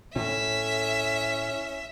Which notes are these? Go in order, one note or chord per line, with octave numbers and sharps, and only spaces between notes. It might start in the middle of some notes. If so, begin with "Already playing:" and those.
A2 C#4 E5